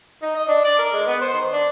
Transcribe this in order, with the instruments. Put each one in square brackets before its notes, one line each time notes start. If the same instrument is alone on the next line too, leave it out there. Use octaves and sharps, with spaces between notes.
[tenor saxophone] D#4
D#5
D4
D5
A#4
G#3
B3
C5
D#3
D4